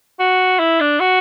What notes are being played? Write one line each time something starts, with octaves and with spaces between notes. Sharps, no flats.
F#4
E4
D4
F#4